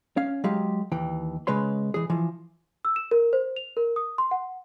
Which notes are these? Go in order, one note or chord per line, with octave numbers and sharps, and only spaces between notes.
C#4 F5
F#3 G#3 G4 F5
D#2 E3 G5
C#3 G#3 B4 C#5 C6
E3 G#4
E3 F3
E6
E7
A#4
C5
F7
A#4
D#6
C6
F#5